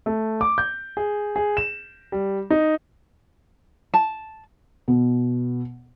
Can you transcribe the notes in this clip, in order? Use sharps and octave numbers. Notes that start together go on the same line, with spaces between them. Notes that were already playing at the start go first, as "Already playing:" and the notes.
A3
D6
G6
G#4
G#4
E7
G3
D#4
A5
B2